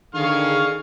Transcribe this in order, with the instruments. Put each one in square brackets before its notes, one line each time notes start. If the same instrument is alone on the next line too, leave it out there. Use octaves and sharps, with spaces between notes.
[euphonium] D3 [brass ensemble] D#3 G#4 [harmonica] F5 C#6 F6